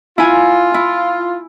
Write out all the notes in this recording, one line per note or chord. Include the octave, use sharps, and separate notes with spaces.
E4 F4 G#5
E4